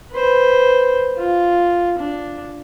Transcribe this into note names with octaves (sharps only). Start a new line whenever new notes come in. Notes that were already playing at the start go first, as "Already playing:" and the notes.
B4 C5
F4
D4